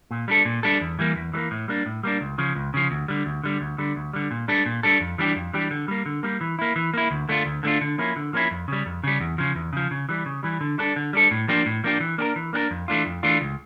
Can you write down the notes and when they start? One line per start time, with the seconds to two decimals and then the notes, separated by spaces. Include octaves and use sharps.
0.11 A#2
0.28 G3 D4 A4
0.45 A#2
0.63 G3 D4 A4
0.81 E2
0.99 E3 G3 A#3
1.16 E2
1.33 E3 G3 A#3
1.51 A2
1.68 G3 A#3 D4
1.86 A2
2.03 G3 A#3 D4
2.21 C#2
2.38 C#3 F3
2.55 C#2
2.74 C#3 F3
2.91 D2
3.08 D3 G3
3.26 D2
3.44 D3 G3
3.61 D2
3.78 D3 G3
3.96 D2
4.13 D3 G3
4.31 A#2
4.48 G3 D4 A4
4.66 A#2
4.83 G3 D4 A4
5.01 F2
5.18 E3 G3 D4 G4
5.36 F2
5.53 E3 G3 D4 G4
5.71 D3
5.88 G3 A#3
6.06 D3
6.23 G3 A#3
6.41 E3
6.59 A#3 E4
6.76 E3
6.94 A#3 E4
7.11 D2
7.29 D3 A3 D4 F4
7.46 D2
7.63 D3 A3 D4 F4
7.81 D3
7.98 F3 A#3 C#4 E4
8.16 D3
8.33 F3 A#3 C#4 E4
8.51 F2
8.68 C#3 G3
8.86 F2
9.04 C#3 G3
9.20 E2
9.38 C#3 F3
9.55 E2
9.73 C#3 F3
9.91 C#3
10.09 E3 G3
10.26 C#3
10.43 E3 G3
10.61 D3
10.78 G3 D4 A4
10.96 D3
11.13 G3 D4 A4
11.31 A2
11.48 F3 A#3 D4 G4
11.66 A2
11.84 F3 A#3 D4 G4
12.00 E3
12.18 A#3 D4 G4 A#4
12.36 E3
12.53 A#3 D4 G4 A#4
12.71 F2
12.88 E3 A3 D4 F4
13.06 F2
13.23 E3 A3 D4 F4
13.41 C#2